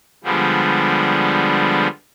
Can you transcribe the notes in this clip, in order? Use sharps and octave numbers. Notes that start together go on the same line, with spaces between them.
D3 F3 G3 G#3 B3 D4